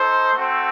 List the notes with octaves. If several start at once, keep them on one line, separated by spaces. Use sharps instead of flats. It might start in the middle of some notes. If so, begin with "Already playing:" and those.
Already playing: D#4 A4 C5
A3 C4 F#4